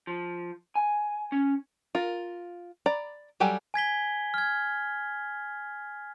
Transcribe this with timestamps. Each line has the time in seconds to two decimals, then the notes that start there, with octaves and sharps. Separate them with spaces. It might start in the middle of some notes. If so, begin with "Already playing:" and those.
0.07 F3
0.75 G#5
1.32 C#4
1.95 F4 A#4
2.86 D5 A#5 B5
3.40 F#3 G3 G4 A4 G#5
3.74 G#5 G#6 B6 G7
4.34 F6 G#6